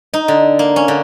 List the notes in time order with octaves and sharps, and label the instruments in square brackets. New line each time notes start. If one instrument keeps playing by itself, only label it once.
[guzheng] D#4
D3
A#3
C#4
D3